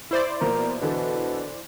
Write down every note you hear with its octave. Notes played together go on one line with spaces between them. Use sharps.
E4 C5 D5
B2 F3 A#3 A#4
B2 D3 E3 A4